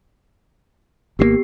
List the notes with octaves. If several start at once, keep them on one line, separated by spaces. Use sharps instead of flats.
G#1 D#3 A#3 B3 G4 C7